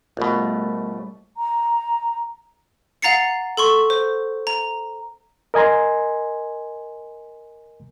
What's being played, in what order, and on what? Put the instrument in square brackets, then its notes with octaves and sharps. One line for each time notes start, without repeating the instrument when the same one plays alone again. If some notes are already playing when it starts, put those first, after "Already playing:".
[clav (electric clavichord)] A#1 B2 [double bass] G3 A3
[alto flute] A#5
[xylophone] F5 F#5 A#5 A6 C7 C#7
A4 C6 C#6
C5
A#5
[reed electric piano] A#4 D#5 G#5 A#5 C6